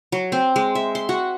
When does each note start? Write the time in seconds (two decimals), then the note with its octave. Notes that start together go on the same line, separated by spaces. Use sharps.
0.12 F#3
0.32 C4
0.56 G#3
0.75 E5
0.95 C6
1.09 F#4